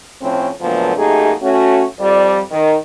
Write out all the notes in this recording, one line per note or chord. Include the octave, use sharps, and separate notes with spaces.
A2 F3 C4 C#4
A#2 D3 F3 F#3 A3 B3
F#2 A3 A#3 D#4 G4 G#4
A3 C#4 F#4
F2 G3 D5
D#3